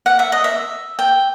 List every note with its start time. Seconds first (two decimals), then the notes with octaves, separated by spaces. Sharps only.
0.06 F#5
0.19 E5
0.32 D#5
0.44 E5
0.99 G5